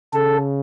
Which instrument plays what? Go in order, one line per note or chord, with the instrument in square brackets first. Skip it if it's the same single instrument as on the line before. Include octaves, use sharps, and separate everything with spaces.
[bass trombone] C#3 [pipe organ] A4